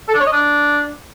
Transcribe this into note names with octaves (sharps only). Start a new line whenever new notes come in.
A4
D4
C#5
D#5
D4